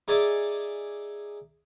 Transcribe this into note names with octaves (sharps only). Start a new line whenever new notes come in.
D#4 G#4 D5 E5 G#5 D6